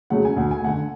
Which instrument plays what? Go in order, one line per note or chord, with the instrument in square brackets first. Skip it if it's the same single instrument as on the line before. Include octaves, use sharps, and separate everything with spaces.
[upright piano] C#3 F#3 A3 F#5
G#5
D2 F#5
G#5
A3 F#5
D3